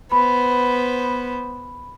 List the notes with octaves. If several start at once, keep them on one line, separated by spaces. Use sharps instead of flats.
B3 C5 B5